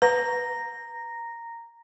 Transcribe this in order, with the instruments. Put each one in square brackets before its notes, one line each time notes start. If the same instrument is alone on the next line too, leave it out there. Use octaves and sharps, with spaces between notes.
[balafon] B4 [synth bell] A#5 A#6